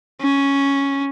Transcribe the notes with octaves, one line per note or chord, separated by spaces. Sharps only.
C#4